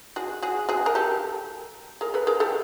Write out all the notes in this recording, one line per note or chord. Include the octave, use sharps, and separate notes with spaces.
F#4 G#4
F#4 G#4
F#4 G#4
A#4
G4 A4
G#4 A#4
A4 B4
G#4 A#4
G4 A4